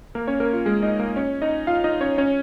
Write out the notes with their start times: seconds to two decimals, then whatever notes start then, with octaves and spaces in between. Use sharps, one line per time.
0.15 A#3 A#4
0.27 C#4 C#5
0.40 A#3 A#4
0.53 F4
0.66 G#3 G#4
0.82 D#4 D#5
0.99 A#3 A#4
1.16 C#4 C#5
1.42 D#4 D#5
1.67 F4 F5
1.84 D#4 D#5
2.01 C#4 C#5
2.18 C#4 C#5